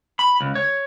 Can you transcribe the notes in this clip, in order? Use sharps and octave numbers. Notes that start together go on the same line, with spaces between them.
B5
C#2
C#5